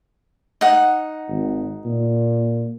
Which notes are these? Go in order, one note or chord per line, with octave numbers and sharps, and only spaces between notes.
D#4 F#5
G#1
A#2